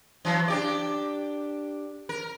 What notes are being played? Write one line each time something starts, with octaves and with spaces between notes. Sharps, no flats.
E3 F#3
D4 G4 D5
A#4